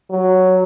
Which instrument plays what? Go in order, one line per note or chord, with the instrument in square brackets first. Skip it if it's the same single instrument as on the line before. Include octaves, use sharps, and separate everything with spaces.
[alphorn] F#3